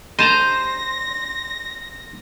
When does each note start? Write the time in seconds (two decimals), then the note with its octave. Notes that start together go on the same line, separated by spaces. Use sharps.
0.19 C5 D#5 A5 A#5 A#6